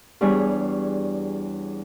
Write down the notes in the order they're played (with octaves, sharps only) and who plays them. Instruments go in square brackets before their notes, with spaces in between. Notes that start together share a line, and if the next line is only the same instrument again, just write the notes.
[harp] E2 G3 D4 G#4 C#5 G#5